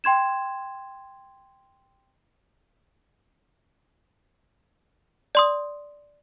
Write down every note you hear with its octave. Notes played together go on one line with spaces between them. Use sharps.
G5 C6 G#6 E7
D5 C6 D#6